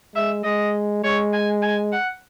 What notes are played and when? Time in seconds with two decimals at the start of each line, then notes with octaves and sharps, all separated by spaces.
0.16 G#3 E5
0.44 G#3 D#5
1.04 G#3 C#5
1.33 G#5
1.62 G#5
1.93 F#5